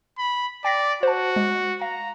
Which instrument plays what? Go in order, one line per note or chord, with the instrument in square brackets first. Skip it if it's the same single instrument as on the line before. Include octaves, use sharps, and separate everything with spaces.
[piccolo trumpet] B5
[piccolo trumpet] D5 [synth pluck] G5 A#6 B6
[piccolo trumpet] F#4 [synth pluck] C5 A5
[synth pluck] G#3
[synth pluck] F5 [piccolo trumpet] A#5